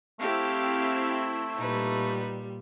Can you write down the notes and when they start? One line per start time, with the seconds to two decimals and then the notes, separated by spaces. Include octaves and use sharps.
0.20 A3 C4 E4 G4 F5
1.57 A#2 G3 D#4 B4